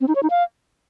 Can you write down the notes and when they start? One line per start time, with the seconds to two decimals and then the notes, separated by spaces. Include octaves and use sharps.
0.01 C4
0.08 D#4
0.15 C#5
0.23 D#4
0.30 F5